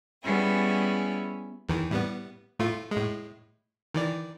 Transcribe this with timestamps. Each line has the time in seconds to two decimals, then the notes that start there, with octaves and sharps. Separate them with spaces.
0.23 G3 B3 C#4 E4 G#4
1.69 E2 D#3 E3
1.91 A2 G3 B3
2.59 A2 A3 F4
2.91 A2 G#3
3.94 D#3 E3 D5